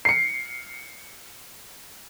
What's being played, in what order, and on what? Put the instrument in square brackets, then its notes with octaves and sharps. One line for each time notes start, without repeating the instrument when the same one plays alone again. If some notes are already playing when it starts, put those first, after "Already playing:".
[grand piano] C7 C#7